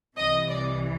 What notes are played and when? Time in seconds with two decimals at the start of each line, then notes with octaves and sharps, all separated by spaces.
0.18 C2 C3 E3 D#5
0.48 D5